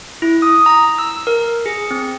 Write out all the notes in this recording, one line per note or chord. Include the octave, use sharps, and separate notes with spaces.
E4
D#6
A#5
E6
A#4
G#4
C4